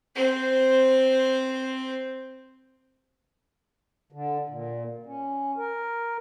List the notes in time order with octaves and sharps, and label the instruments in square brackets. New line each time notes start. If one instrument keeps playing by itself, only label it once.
[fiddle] C4 C5
[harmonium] D3
A#2
C#4
A#4